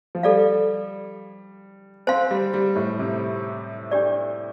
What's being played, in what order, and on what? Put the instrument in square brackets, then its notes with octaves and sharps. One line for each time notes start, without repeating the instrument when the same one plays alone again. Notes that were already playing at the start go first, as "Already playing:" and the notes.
[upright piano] F3
[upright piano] G3 [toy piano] A4 D5 F5
[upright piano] C4 [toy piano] C5 F5 C6
[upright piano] G3
G3
A2
C3
[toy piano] D4 G4 D5